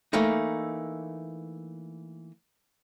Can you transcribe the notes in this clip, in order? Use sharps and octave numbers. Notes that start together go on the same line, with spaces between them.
E3 A3 A#3 D#4